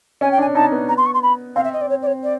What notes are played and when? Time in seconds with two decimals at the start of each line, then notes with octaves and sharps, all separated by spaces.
0.21 C#4 G#5
0.31 G5
0.38 D4 G#5
0.55 D#4 A5
0.72 B3
0.88 A#5
0.97 C6
1.06 C#6
1.14 C6
1.22 B5
1.56 C4 F5
1.64 E5
1.73 D#5
1.81 D5
1.89 C#5
2.02 D5
2.06 C#5
2.23 D5